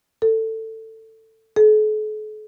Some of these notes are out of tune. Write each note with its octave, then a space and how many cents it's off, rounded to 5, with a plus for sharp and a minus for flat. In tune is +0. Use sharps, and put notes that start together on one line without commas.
A4 +15
A4 -45